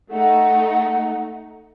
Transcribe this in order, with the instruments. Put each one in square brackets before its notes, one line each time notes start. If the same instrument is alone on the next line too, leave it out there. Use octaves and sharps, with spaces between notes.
[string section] A3 D#4 [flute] F#5